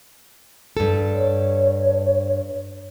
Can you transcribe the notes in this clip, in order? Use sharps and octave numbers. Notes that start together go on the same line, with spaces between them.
G2 A4
C#5